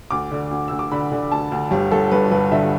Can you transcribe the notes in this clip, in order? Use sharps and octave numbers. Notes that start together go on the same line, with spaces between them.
D2 D6
D3
D2
D2 E6
D6
D3 B5
D3
D2 A5
D2
G1 G4
G1 A4
G2 B4
G1 B4
D3 E5